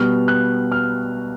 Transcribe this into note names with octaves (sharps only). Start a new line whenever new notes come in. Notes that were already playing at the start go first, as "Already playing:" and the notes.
Already playing: B2 G3 B3 F6
F#6
F6